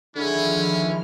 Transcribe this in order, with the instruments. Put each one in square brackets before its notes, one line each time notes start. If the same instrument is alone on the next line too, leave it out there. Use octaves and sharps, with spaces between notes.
[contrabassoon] D3 [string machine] D#3 F3 F6 [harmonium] G#3 E4 [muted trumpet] C#4